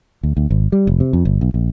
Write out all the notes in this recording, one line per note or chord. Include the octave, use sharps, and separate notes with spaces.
D2
D2
G#1
G3
F1
C3
F2
G1
B1
A#1